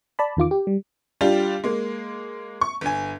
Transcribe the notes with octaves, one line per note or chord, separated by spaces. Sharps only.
D5 A5 B5
E2 D#3 F4 D6
G4
G3
G3 D4 F4 G4
G#3 A#3
C#6
G1 G#5